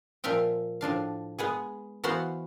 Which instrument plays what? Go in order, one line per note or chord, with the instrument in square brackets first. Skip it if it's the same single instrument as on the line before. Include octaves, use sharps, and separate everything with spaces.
[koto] A#2 F3 E5 F5 G5
A2 F3 D4 F5
G#3 B3 G#4
E3 B3 F#4 C5 F5 F#5